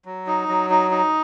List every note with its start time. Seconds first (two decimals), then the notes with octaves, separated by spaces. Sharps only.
0.05 F#3
0.27 D#4
0.49 F#3
0.70 D#4
0.91 D#4